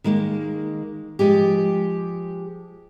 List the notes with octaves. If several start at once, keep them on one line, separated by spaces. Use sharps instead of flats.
D#3 G#3 A#3
F3 G#3 G4